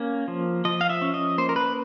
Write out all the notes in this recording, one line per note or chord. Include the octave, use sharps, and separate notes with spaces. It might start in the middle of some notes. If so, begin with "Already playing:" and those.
Already playing: A#3 C#4
F3
F3 D#5
F5
E5
C#4
D#5
A#3 C5
A#4
B4